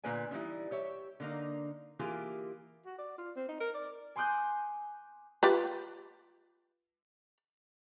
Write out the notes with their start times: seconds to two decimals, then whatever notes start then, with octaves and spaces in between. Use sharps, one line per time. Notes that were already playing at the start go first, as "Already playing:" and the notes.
0.04 A#2 D3 A#3 B4 D5 G#5
0.31 D3 E3 G3 D#4 E4
0.71 G4 C#5 E5
1.20 D3 A#3 D#4
1.99 E3 A#3 F4 G4 G#4
2.86 F#4
2.98 D5
3.18 F4
3.36 C4
3.49 D#4
3.61 A#4
3.75 D5
4.16 G#5 C6 D6 D#6 F#6 G6
5.43 F4 G4 B4